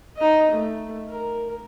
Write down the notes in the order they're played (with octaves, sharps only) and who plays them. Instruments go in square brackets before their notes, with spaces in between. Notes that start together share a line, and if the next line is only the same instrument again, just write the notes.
[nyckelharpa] D#4 D#5
A3
A#4